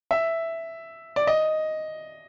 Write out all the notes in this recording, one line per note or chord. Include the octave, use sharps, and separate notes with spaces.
E5
D5
D#5